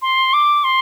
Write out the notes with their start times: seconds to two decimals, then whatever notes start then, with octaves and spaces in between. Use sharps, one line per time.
0.02 C6
0.34 D6
0.64 C6